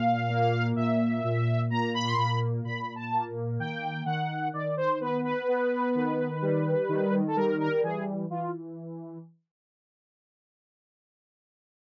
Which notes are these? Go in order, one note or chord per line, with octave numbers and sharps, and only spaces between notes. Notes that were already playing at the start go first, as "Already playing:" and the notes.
Already playing: A#2 F5
A#3
A#2 E5
A#2
A#3 A#5
B5
C6
A#2 B5
A#2 B5
A5
A#3
D#3 G5
D#3 F#5
D#3 D5
C5
B3 B4
B4
B3
D#3
G3
D#3
A4
G3 A#4
A#4
E3 G#4
E3 F4